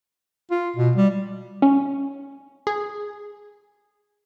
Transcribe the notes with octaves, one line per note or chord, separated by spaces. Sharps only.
F4
B2
G3
C#4
G#4